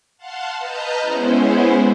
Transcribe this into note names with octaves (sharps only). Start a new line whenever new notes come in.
F5 F#5 A5 C6
B4 D#5 A5 A#5 F6 G6
G#3 B3 C#4 E4 C5